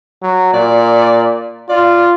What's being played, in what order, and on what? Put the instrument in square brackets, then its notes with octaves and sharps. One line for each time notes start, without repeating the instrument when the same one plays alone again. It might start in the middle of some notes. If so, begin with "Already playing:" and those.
[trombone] F#3
[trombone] A#2 [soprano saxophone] D5
[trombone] F4 [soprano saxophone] D5